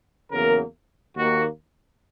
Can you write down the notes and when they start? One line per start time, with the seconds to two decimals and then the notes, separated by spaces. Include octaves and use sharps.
0.32 E2 C#3 F#3 A#3 A#4
1.15 D#2 D#3 A#3 F#4